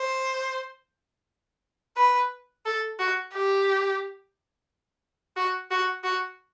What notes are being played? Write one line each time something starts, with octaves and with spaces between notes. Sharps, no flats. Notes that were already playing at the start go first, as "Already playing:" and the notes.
Already playing: C5
B4
A4
F#4
G4
F#4
F#4
F#4